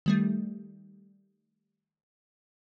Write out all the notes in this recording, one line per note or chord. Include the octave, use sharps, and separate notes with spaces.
D#3 G3 A3